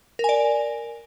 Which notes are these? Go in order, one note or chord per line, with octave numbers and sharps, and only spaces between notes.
A#4 D5 G#5